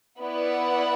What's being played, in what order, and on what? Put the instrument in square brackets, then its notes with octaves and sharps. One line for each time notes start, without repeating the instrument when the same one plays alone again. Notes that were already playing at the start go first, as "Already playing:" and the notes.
[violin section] B3 E4 D5 F#5